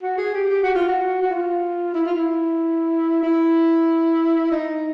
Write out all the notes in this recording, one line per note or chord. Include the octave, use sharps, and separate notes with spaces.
F#4
G#4
G4
G4
F#4
F4
F#4
F#4
F4
E4
F4
E4
E4
D#4